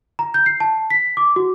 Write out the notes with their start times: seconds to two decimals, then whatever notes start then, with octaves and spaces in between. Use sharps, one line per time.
0.19 A#5
0.34 G6
0.46 C7
0.60 A5
0.90 B6
1.17 D6
1.36 F#4